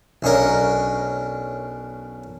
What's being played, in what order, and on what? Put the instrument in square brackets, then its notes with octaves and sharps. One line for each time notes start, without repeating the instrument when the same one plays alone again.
[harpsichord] B1 C#4 D4 A#4